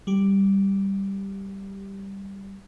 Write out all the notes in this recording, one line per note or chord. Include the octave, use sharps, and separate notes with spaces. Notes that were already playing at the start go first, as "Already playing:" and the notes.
G3 G4